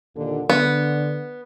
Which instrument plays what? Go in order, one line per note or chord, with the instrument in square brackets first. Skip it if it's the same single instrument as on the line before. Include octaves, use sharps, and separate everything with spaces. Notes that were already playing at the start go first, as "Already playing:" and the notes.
[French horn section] D#2 A#2 D3
[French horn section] D3 [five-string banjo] B3